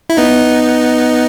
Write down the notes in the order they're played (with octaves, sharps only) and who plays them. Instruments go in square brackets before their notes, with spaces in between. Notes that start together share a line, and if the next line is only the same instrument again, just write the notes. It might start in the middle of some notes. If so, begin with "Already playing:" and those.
[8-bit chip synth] E4
B3 D#4